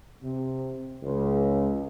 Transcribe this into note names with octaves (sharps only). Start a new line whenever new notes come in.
C3
C#2